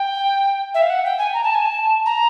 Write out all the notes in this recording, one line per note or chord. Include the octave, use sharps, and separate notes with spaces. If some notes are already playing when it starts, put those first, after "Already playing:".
Already playing: G5
E5
F5
F#5
G5
G#5
A#5
A5
G#5
A5
A#5